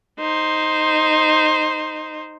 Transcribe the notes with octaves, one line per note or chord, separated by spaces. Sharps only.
D#4 C5